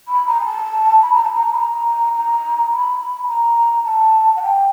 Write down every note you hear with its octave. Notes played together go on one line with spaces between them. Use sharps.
B5
A#5
G#5
A5
B5
A#5
A5
A#5
B5
A#5
A#5
B5
A5
A#5
A5
F#5
G5